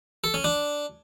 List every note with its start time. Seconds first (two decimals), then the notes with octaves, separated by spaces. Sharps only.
0.24 A4
0.34 C#4
0.44 D4